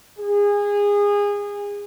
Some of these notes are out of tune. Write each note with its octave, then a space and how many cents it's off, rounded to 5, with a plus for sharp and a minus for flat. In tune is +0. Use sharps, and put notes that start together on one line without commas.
G#4 -25